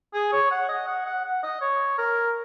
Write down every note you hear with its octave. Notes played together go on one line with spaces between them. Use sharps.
G#4
C#5
F#5
D#5
F#5
F#5
F#5
D#5
C#5
A#4